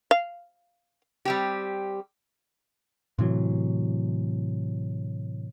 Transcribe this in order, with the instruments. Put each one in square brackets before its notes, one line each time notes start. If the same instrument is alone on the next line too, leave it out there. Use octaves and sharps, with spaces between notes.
[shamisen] F5
[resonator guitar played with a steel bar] G3 C4 G4
[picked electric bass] A2 C3 E3 F#3